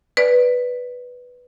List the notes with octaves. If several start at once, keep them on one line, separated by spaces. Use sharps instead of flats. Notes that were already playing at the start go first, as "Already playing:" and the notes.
B4 D5